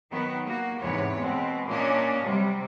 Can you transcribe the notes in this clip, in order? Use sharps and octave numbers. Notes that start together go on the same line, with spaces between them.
D#3 F#3 B3
A#3 F#4
E2 G#2 C3 B3 C#5
B2 G#3 C4
A#2 A#3 C#4 D4 C#5 D#5
C3 F#3 G3